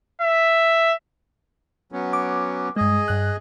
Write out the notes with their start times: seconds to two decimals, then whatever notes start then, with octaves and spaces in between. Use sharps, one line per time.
0.22 E5
1.92 F#3 B3 C#4
2.13 D6
2.76 G2 G#3 G#4 D#5
3.08 G2 F#6